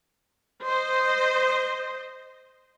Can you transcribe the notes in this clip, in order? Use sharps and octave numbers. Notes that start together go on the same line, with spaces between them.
C5 D#5